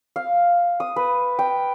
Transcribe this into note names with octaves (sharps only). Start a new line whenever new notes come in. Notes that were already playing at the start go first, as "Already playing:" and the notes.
F5
D#6
B4
G5